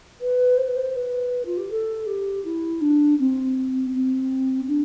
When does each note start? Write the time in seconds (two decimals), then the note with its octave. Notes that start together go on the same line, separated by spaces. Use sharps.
0.21 B4
0.57 C5
0.67 B4
0.76 C5
0.96 B4
1.45 F4
1.57 G4
1.70 A4
2.06 G4
2.44 E4
2.81 D4
3.19 C4
3.93 C4
4.67 D4